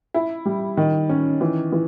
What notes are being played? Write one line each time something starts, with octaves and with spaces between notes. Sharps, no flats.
E4
G3
D#3
C#4
E3
E3